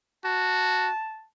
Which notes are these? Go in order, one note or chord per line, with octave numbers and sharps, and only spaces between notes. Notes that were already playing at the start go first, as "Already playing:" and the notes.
F#4 A5